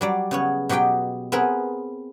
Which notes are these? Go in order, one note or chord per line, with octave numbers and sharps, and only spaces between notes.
F#3 G3 D5
C#3 B3 C#5
B2 F#3 G4 D#5 G5
B3 C4 G#4 A#4 B4